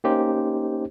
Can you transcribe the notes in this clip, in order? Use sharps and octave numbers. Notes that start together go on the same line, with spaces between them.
A#3 C#4 D#4 G4 C5